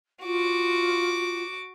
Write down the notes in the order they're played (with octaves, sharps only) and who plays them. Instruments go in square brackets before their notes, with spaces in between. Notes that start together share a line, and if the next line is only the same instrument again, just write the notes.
[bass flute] F4 [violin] F#4 D6